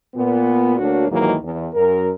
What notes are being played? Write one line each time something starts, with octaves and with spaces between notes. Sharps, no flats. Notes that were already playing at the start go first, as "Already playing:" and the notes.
A#2 B3
D2 A3 A#3 D4 F#4 C#5
D#2 G#2 D#3 E3 F#3 A#3
E2
F#2 A#4